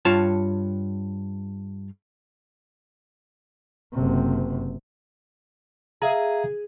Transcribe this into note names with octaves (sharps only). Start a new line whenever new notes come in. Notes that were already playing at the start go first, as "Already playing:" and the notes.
G2 F4 C#5 A5
F#1 C3
G#4 E5 F5 A#5